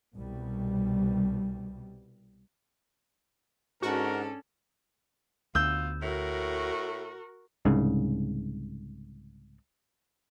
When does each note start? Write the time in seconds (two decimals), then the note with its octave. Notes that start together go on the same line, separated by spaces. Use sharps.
0.15 C2 B2 G3
3.82 G#2 C#4 D4 F#4 A4 A#4
5.55 D2 B3 F4 E6 G6
6.03 A2 F#4 A#4
7.65 C2 G#2 C#3